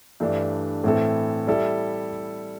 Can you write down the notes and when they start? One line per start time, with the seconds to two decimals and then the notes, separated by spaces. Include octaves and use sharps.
0.20 G2 E3 A3 D4
0.84 A2 E3 C4 E4 A4
1.47 G3 E4 A4